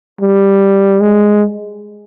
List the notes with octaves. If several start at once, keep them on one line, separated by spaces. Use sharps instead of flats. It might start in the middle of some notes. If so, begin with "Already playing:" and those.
G3
G#3